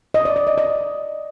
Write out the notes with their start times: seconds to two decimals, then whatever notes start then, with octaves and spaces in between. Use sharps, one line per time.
0.14 D#5
0.25 D5
0.36 D5
0.47 D#5
0.58 D#5